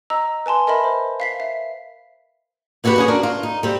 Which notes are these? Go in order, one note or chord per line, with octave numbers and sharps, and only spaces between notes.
D#5 A#5 E6
B4 G#5 A5 C6
A#4 D#5 E5 B5
C5
F5 B6 C7
E5
B3 E4 F#4 G4 B4
B3 C#4 G#4
D4 F#4 A#4
F4
D#4
G3 C4